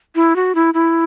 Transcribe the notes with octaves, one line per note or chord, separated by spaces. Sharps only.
E4
F#4
E4
E4